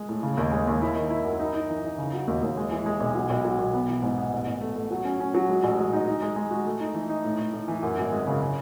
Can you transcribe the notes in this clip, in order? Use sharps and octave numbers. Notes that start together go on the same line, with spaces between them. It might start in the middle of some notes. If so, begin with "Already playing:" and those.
Already playing: G#3
A2
C#3
D#2
G#3
D#2
E4
D#3
E4
F#2
D#4
D#4
E3
D#4
C#3
F#3
D#2
D#2
G#3
E3
G#3
B1
F#3
B1
F#3
B1
B3
E3
G#2
B3
A1
A1
A3
A3
F#3
C#4
C#4
F#3
G#3
A1
G#3
D#4
D#4
G#3
G#3
F#4
A3
D#4
E3
D#4
A2
A2
A2
E3
F#2
G#1
G#3
C#3
C#3